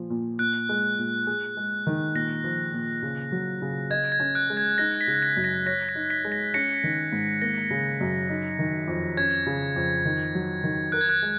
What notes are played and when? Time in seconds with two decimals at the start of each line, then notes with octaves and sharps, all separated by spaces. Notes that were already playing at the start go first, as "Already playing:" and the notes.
Already playing: A#2 F3
0.10 A#2
0.39 A#2 F#6
0.69 G#3
0.99 A#2
1.27 G#4
1.57 G#3
1.87 D#3
2.15 A#2 A#6
2.44 F3
2.73 A#2
3.03 C#3
3.32 F#3
3.62 C#3
3.90 D#5 G#6
4.12 G#6
4.20 C#4
4.35 F#6
4.50 G#3
4.57 G#6
4.78 D#4 A#6
5.01 B6
5.07 C#3
5.22 A#6
5.37 F#2
5.44 A#6
5.66 C#5 A#6
5.89 A#6
5.95 D#4
6.10 B6
6.25 G#3
6.32 A#6
6.54 C#4 A#6 C#7
6.84 D#3
7.12 G#2
7.42 A#3 A#6
7.70 C#3
8.01 F#2
8.29 D#4
8.59 D#3
8.88 F2
9.17 C#4 G#6
9.46 C#3
9.76 F2
10.05 D#3
10.35 F#3
10.64 D#3
10.92 A#4 F#6
11.01 G#6
11.09 F#6
11.22 G#3